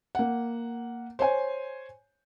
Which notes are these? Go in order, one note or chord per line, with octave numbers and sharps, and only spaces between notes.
A#3 F#5
C5 C#5 G#5